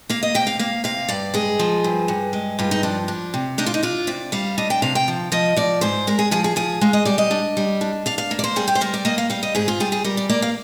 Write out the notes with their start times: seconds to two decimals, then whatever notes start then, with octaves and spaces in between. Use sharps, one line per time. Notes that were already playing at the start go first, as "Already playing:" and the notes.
0.09 A#3 F5
0.23 D#5
0.34 C3 G5
0.47 F5
0.59 A#3 F5
0.84 C3 F5
1.09 G2 D5
1.34 G#3 G#4
1.59 F3
1.84 G2
2.08 G2
2.33 G#3
2.59 G2 F4
2.71 D#4
2.83 F3 D4
3.08 D4
3.34 C3
3.58 D4 D#4
3.66 F4
3.74 D#4
3.83 D4 F4
4.07 C3 D5
4.32 G3 F5
4.58 D4 D#5
4.70 G5
4.82 C3 F5
4.95 G5
5.08 F3
5.32 F3 D#5
5.56 F3 D5
5.81 G#2 C5
6.07 G#3 A#4
6.19 G#4
6.31 F3 G#4
6.44 G#4
6.56 F3 G#4
6.81 G#3 F5
6.93 D#5
7.05 G3 D5
7.18 D#5
7.31 D4
7.57 G3
7.81 D4
8.06 D4 F5
8.18 F5
8.31 A#3
8.39 D5
8.44 C5
8.56 G3 G#4
8.68 G4
8.75 C5
8.81 G3 A#4
8.94 D5
9.05 A#3 D#5
9.18 F5
9.30 G3 F5
9.43 D#5
9.55 G#2 G#4
9.68 F4
9.80 G3 G#4
9.92 G#4
10.04 G3 A#4
10.17 D5
10.29 A#3 D5
10.42 F5